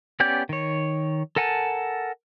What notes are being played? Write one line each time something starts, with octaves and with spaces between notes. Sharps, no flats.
B3 C#4 G4 D5 G6
D#3 C#5
A4 A#4 F#5 G#5 A5